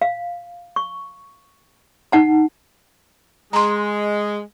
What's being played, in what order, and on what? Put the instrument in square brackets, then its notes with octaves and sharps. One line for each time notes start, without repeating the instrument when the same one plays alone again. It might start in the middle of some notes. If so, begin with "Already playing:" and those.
[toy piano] F5
C#6
D#4 F#5 A5
[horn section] G#3 [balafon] A#5 C6